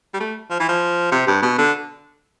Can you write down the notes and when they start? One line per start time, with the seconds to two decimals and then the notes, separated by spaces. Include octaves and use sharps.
0.14 G3
0.20 A3
0.51 F3
0.60 E3
0.69 F3
1.12 C3
1.27 G2
1.42 B2
1.58 D3